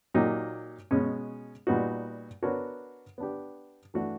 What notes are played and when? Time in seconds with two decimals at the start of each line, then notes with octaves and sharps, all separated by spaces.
0.14 A#2 F#3 A#3 D#4 G4
0.91 B2 G#3 C#4
1.67 A#2 G3 B3 D#4 F#4
2.43 B3 D4 F#4 A#4 C#5
3.18 B3 D4 G4
3.94 E3 A3 D4 F#4